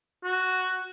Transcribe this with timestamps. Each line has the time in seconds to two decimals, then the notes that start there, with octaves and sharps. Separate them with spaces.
0.24 F#4